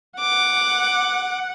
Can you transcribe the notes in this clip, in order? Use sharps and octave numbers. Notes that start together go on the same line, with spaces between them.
F#5 D6